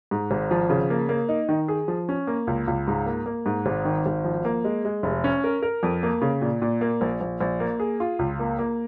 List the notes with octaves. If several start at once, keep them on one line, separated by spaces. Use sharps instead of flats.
G#2
G#1
F3
C#3
A#3
A#3
D#4
D#3
G#4
F3
C#4
A#3
C#2
C#2
G#2
A#3
A#3
G#2
G#1
D#3
G#1
F3
A#3
G#3
G#3
F1
C#4
A#4
A#4
F2
A#3
C#3
A#2
A#2
A#3
A#1
A#1
A#1
A#3
G#4
F4
C#2
A#3
A#3